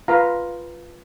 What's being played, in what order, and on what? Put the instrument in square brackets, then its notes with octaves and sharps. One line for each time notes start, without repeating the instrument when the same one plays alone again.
[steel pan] F4 B4 F5 A#5